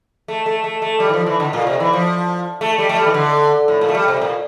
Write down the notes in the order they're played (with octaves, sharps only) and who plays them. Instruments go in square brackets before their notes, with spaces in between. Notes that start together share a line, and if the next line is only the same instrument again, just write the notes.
[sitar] A3
A3
A3
A3
G3
E3
F3
E3
D3
A#2
C3
E3
F3
A3
G3
A3
G3
E3
D3
A2
A#2
A3
G3
C3
A#2